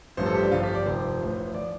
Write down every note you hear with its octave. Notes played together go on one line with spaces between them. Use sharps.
A1 G2 F3 C5
A4
G4
D4
G1 G2 F3 F4
G4
D5
F1 F2 F3 C5
A1 A2 F3
F3 D5